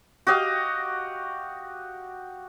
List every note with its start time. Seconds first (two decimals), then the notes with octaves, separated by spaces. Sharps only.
0.27 F#4 G4 D#5 F5